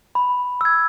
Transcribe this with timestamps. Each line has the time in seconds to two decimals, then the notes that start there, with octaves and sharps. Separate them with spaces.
0.15 B5
0.61 E6 G#6